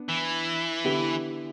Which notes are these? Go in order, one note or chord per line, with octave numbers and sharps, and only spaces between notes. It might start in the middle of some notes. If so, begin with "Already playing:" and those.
Already playing: B3 D4
E3
D3 B3 E4 G4